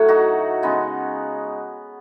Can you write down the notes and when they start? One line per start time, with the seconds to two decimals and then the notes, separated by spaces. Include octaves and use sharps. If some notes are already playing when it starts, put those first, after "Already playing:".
Already playing: A2 F#3 A3 C#5 F#5
0.08 D#4 F#4
0.63 C#3 G#3 B3 D#4